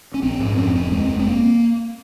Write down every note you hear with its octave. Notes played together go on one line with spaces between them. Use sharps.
C#4
A#1 C4
G#2
F2 C#4
F1 C4
D#2 G#3
F1
C4
A#3